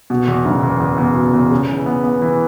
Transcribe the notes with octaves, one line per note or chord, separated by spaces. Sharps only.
B2
E2
F#1
E2
E2
E2
B2
E2
C#3
E3
B3
B3
E3